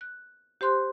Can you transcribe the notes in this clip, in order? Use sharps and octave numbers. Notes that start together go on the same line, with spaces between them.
F#6
G4 C5 C6 F#6